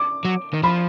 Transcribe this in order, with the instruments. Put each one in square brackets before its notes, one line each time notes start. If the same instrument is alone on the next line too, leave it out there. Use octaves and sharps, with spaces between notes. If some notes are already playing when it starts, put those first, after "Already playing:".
Already playing: [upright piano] D6
[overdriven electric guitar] F#3
D#3
[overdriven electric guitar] F3 [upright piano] B5